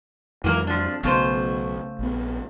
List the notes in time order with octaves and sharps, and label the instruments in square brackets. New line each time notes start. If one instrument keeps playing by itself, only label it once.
[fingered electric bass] F2 F#3 G#3 [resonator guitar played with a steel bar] E3 A#3 A#4
[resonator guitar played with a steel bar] F3 D4
[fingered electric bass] B1 F#3 B3 [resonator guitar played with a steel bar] C#3 A3 C5
[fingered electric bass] A#1 B3